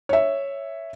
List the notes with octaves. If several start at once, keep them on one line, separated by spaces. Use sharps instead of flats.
C#5 E5